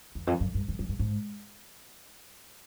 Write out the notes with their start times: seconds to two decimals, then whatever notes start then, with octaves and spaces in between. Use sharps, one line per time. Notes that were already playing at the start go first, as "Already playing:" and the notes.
0.15 E2
0.27 F2
0.40 F#2
0.55 G2
0.68 F2
0.79 F#2
0.89 G2
0.99 G#2